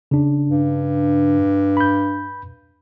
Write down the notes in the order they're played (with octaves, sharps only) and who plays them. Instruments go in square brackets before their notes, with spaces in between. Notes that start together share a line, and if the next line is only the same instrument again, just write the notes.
[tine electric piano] C#3 D4
[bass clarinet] G2
[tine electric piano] B5 G6